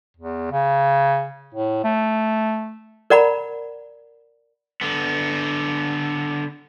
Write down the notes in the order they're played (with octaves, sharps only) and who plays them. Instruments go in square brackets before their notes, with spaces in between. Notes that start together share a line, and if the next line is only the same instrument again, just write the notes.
[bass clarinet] E2
C#3
A2
A3
[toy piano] A#4 D5 F#5 A#5 B5
[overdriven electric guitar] D3 B3